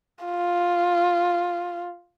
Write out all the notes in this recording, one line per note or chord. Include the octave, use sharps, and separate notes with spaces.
F4